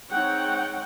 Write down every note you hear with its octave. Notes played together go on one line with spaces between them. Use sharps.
G#3 C4 D#4 C#5 F#5 G5